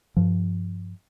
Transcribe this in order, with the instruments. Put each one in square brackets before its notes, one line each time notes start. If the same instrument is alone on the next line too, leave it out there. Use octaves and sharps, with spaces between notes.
[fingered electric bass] G2 F3